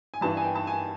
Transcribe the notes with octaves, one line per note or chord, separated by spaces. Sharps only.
G#5
G2 E3 G3 A5
G#5
G5
A5
G#5